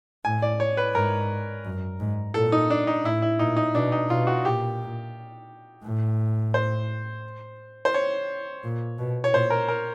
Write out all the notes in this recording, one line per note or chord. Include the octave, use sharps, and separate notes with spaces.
A2 G#5
D5
C#5
B4
G#2 A#4
F#2
G#2
A#2 A4
D#4
D4
D#4
A2 E4
E4
A#2 D#4
D#4
B2 D4
D#4
B2 F4
F#4
A#2 G4
A2
C5
C5
C#5
A#2
B2
C#5
A#2 C5
A#4
A#4